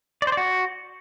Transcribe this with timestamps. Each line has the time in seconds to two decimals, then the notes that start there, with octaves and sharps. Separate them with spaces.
0.22 D5
0.27 C5
0.32 D5
0.37 F#4